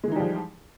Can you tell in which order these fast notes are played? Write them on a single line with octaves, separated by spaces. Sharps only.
G#3 E3 D#4 G3 F3